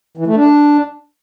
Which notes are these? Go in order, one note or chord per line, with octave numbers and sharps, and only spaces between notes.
E3
A3
D4